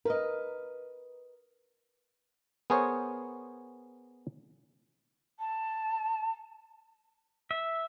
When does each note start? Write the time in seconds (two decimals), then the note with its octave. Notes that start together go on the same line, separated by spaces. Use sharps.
0.05 A#4 B4 D#5
2.70 B3 G#4 A#4 C5 C#5
5.39 A5
7.51 E5